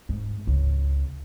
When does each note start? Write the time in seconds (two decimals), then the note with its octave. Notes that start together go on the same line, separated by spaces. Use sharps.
0.09 G#2
0.47 C#2